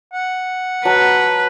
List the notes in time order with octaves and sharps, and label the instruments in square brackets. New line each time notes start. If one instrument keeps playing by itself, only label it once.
[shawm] F#5
[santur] F#3 A5 [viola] B4